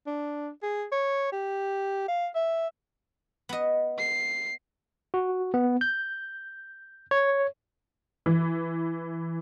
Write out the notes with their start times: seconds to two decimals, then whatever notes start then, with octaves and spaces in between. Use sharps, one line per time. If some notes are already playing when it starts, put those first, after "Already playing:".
0.07 D4
0.63 G#4
0.92 C#5
1.32 G4
2.08 F5
2.35 E5
3.49 B3 D#5
3.98 C7
5.14 F#4
5.54 B3
5.81 G6
7.11 C#5
8.26 E3